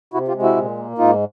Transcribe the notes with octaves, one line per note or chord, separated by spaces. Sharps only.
C3 E4 F#4
F4 G4
G#3
E4 F#4
A#2
A#3
G#2 D#4 F4